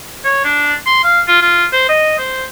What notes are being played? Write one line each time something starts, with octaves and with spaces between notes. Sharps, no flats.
C#5
D4
C6
F5
F4
F4
C5
D#5
C5